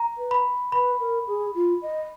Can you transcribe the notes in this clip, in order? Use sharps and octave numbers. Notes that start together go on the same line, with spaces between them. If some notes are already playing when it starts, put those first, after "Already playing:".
Already playing: A#5
B4
B5
B4 B5
A#4
G#4
F4
D#5